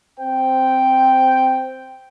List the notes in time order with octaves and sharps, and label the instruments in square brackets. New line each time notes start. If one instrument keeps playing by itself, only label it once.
[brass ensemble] C4 C5 G5